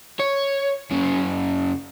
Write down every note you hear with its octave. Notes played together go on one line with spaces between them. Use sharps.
C#5
F#2 C#3